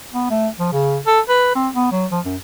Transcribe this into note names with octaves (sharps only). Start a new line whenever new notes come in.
B3
A3
F3
C#3
A4
B4
C4
B3
F#3
F3
F#2